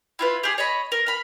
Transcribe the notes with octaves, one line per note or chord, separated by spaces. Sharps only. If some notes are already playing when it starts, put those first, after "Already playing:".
E4 F4 B4
G4 G#4
C#5 D#5 B5
A#4
F5 B5